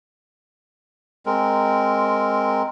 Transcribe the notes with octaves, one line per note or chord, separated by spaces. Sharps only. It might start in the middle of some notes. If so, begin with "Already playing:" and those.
G#3 C4 A#4